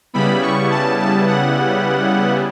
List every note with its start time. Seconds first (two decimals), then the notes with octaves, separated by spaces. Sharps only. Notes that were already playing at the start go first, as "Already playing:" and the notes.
0.14 C#3 G3 B3 E4 B5
0.42 C#6
0.71 A5
0.99 A5
1.27 F#5